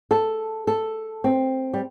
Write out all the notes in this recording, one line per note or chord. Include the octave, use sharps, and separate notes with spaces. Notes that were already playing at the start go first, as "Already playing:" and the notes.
A4
A4
C4
G3